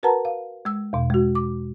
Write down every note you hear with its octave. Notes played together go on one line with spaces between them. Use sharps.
F#4 A#4 B4 F#5 A5 A#5
F5
G#3 E6
E2 B2
G#3 F#4
D6